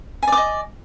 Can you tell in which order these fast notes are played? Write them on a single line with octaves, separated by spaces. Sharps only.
G#5 D5 D6 D#5